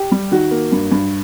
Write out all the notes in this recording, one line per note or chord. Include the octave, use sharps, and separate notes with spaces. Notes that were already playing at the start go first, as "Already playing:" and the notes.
Already playing: G4
G3
D#3 F#4
A#3
G2
G2